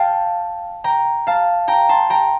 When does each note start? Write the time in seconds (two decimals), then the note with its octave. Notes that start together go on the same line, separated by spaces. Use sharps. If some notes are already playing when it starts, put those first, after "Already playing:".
Already playing: F5 G5 A5
0.84 G5 A#5
1.27 F5 A5
1.68 G5 A#5
1.89 A5 C6
2.10 G5 A#5